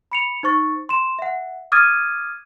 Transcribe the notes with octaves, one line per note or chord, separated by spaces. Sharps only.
B5 C#7 F7
D#4 C5 C#6 A6
C6 E7
E5 F#5
D6 D#6 F6 G#6 A6 D#7